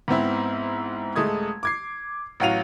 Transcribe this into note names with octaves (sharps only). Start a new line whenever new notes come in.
G#2 B3 C4 E4
D#1 G#3 A3 D#6 G#6
D6 G#6 C7
A1 F#3 F#4 F5 D#7 F7